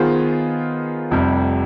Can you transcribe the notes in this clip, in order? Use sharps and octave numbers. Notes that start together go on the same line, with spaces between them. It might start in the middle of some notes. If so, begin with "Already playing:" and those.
Already playing: D#3 B3 F4 G#4 C5
F1 F2 C3 G3